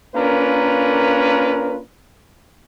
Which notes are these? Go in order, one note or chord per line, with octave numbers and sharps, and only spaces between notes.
A#3 C#4 D4 F4 A#4 B4